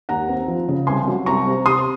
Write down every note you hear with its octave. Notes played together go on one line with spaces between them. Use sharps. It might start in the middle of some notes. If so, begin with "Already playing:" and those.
D#2 F#5 A#5
C4
F3
C#3
C2 G#5 C6
F#3
C2 A#5 C#6
C3
C3 C6 D#6